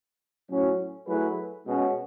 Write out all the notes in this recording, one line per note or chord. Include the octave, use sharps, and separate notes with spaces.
A2 F#3 C#4
F#3 A3 E4 G#4 B4
B2 G#3 C#4 F#4